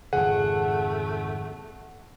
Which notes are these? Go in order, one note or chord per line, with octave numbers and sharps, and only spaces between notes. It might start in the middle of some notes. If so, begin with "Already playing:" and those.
G#1 F2 C#3 A3 G#4 F#5